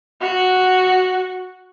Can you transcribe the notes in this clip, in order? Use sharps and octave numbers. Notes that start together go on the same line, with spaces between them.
F#4